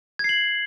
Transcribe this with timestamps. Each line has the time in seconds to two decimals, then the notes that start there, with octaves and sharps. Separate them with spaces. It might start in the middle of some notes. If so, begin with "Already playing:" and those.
0.19 G#6
0.24 C7
0.29 F#7